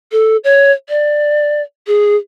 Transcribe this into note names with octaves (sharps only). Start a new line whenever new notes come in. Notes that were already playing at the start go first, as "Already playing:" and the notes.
A4
C#5
D5
G#4